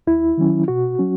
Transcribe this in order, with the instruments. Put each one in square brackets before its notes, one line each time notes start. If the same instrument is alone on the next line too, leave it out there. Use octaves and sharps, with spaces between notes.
[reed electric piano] D#2 E4
D#3 F#3 C#4
B2 F#4
F#3 C#4